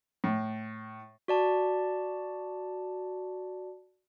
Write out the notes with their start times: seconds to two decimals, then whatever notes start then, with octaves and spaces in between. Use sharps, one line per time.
0.24 A2
1.28 F#4 D5 A5